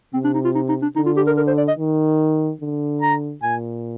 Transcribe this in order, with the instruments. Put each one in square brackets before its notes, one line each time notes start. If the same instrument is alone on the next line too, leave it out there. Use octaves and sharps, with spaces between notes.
[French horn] C3 [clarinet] C4
[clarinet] D4
D#4
F4
D#4
D#4
D4
[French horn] D3 [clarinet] D#4
[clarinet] F4
G4
A#4
A#4
C5
D5
D#5
[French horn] D#3
D3
[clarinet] A#5
[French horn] A#2 [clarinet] G#5